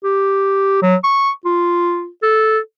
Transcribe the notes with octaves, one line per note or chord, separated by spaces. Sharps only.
G4
F#3
C#6
F4
A4